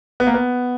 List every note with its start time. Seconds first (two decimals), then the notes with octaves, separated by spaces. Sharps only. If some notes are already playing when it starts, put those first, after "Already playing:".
0.20 B3
0.27 A#3
0.34 B3